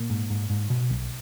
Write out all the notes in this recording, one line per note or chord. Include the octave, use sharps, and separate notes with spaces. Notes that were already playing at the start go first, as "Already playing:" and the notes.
Already playing: A#2 A#3
G#2
G#2
G#2
B2
B1